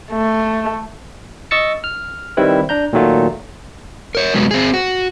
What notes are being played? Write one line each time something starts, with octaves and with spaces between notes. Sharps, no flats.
A3
D#5 C#6 E6 A6 C#7
F6
D#3 G3 C4 E4 B4
D4 A#5 G6
A#2 D#3 F#3 A3 F4
A#4 C#5
F#2 C3 F#3 G#3 B3
C4 G#4
F#4